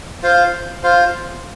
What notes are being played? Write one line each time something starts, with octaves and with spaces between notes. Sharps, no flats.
F4 C5 F5
F4 C5 F5